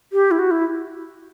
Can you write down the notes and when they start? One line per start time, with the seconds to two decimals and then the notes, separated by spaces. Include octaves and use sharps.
0.13 G4
0.31 E4
0.39 F#4
0.51 E4